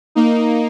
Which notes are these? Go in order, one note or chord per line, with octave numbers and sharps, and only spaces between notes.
A#3 D#4